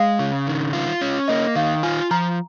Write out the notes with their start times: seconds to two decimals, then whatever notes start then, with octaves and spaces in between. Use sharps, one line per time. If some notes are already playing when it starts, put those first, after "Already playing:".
Already playing: G#3 F5
0.19 C#3
0.47 D#3
0.73 F4
1.01 C#4
1.28 A#3 D#5
1.56 D#3 F5
1.83 F4 G#5
2.11 F3 A#5